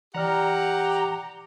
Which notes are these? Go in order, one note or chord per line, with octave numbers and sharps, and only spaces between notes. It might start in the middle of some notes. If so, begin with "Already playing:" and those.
E3 G4 D5 F#5 A#5 F6